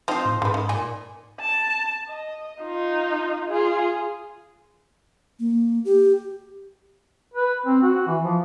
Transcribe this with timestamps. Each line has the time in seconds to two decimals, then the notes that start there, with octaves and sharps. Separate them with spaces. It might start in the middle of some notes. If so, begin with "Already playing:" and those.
0.08 F3 C4 D#4 C5
0.25 A2
0.42 G#2 C#3 B4
0.54 D#3
0.69 A#2 G#5
1.41 A5
2.09 D#5
2.62 D#4 F4
3.49 F4 G#4
5.39 A#3
5.85 G4
7.34 B4
7.66 C4
7.82 F#4
8.07 E3
8.24 F3